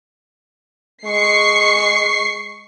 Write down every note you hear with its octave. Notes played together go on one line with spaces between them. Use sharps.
G#3 C#6 C7